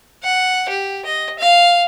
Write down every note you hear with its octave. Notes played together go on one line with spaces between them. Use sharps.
F#5
G4
D#5
F5